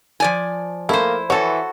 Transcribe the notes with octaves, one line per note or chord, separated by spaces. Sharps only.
F3 D5 G#5
A3 A#3 E4 C5
E3 F#4 A4 C#5